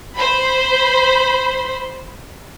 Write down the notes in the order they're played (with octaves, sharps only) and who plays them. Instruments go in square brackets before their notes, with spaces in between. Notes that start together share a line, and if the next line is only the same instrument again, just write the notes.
[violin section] C5 B5